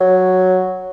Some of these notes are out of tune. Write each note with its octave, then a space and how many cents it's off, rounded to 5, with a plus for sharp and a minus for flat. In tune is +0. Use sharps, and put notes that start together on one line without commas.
F#3 +0